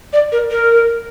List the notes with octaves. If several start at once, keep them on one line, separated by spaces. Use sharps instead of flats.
D5
A#4
A#4